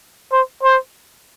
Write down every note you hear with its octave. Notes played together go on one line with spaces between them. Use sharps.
C5
C5